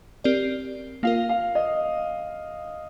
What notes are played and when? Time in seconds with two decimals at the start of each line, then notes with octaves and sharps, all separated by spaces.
0.24 C4 G4 A#4 D5
1.03 A#3 F4 A#4 F5
1.29 F5
1.55 D#5